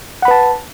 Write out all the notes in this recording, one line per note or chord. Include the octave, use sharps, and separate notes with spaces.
B4 F#5 A5 B5